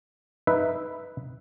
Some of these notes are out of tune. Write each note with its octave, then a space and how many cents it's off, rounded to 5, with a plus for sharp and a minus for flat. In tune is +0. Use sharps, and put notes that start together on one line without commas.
D#4 +0 B4 +0 E5 +0